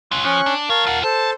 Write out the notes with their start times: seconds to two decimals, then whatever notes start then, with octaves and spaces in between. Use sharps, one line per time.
0.12 C#4 F4 F#6
0.24 F3 C#4 C#6 F#6
0.46 D4
0.70 F2 A#4 C#5 F5 A5
0.87 F4 F#5
1.04 A4 C5 A5